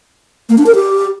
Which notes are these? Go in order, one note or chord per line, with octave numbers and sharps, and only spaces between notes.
A#3
D4
A#4
G4